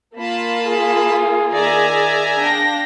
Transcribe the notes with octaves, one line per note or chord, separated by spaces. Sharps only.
A#3 F4 A5 B5
G#4
D#3 D5 E5 G#5 A#5
D4 F5 G5 A#6